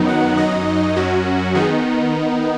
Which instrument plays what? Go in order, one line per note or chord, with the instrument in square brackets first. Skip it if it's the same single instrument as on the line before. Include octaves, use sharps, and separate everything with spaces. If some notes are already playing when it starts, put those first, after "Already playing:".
Already playing: [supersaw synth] F#2 D#3 F#3 B3 D#4
F#5
F#2 F#3 D#4 D#5
F#2 F#3 C#4 F#4
D#3 B3 D#4 G#4